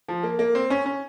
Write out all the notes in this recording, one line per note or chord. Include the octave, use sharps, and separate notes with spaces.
F3
A#3
A#3
C4
C#4
C#4